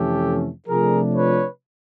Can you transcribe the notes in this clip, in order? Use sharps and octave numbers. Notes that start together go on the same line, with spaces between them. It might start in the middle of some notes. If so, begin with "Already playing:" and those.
Already playing: F2 C3 E3 A3 C#4 G4 A4
C3 F3 A3 D4 F4 G#4 A#4
B4 C#5